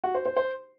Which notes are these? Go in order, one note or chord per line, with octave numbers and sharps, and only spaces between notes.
F#4
C5
C5
C5